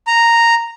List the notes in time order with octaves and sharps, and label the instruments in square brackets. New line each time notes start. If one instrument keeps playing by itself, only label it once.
[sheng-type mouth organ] A#5